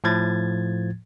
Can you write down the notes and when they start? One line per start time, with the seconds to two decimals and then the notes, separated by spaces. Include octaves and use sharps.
0.04 A2 F3 G#6 A6